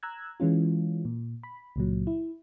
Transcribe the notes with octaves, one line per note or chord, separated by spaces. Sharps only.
A#5 E6 F#6 G#6
E3 G#3 C#4 F4
A#2
B5
C#2 A#2 F#3
E4